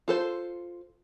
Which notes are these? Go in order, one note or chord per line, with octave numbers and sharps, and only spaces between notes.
F4 A4 C5